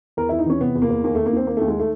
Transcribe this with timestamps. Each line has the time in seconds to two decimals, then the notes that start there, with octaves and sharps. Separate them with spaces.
0.17 E2 A#4
0.29 E2 E4
0.39 D#4
0.46 E3 C#4
0.60 C3 B3
0.75 E2
0.82 A#3
0.89 E2
1.04 D#2 A#3
1.15 D#3 A3
1.26 A#3
1.33 D#2 C4
1.47 D#3 A#3
1.57 D#2 A3
1.68 G#3
1.75 D#3 A3